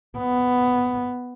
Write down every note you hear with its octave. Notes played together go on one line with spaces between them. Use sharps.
B3